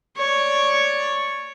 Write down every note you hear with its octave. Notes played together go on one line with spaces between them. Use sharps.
C#5 D5